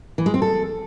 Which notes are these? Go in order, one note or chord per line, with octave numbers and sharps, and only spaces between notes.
E3
G#3
C4
A4